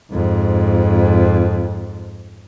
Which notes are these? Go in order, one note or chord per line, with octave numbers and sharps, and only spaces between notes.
F2 G#2